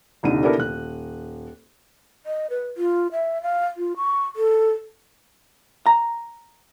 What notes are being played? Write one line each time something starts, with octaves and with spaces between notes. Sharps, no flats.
D#1 C2 D3 D#4 D#7
B3 D4 E4 G4 A4 A#4
D#1 F#6
D#5
B4
F4
E5
F5
F4
C#6
A4
A#5